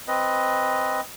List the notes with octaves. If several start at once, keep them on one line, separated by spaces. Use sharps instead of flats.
C4 B4 D#5